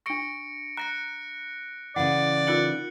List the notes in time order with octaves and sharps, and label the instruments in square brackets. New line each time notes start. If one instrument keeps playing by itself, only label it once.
[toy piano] D4 C#6 [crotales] A#6 C#7 D7
[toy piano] A#5 [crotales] F#6 A#6 C#7
[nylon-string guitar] C#3 E3 [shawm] D5 [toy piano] F#5
[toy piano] D#4 F4 A#4 [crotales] F#6 C#7 F#7